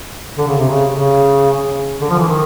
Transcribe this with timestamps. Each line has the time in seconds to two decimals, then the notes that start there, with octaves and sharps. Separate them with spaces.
0.38 D3
0.48 C#3
0.58 C3
0.69 C#3
0.92 C#3
2.01 D3
2.10 F3
2.19 E3
2.28 D#3